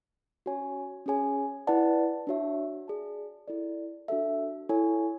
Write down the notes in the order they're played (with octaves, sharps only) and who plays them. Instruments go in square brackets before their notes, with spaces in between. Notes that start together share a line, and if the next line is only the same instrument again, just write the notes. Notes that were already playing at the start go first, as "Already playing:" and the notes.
[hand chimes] C#4 F#4 C#5 G#5
C#4 G#4 C#5 G#5
E4 B4 D5 F#5 A5
D4 F#4 C#5 E5
G#4 D5 A5
E4 A4 D5
D4 F#4 A4 E5
E4 A4 C#5 G#5